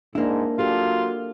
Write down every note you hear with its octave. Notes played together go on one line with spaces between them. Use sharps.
G#2 A#3 D4 E4
F#3 D4 F4 G4 A4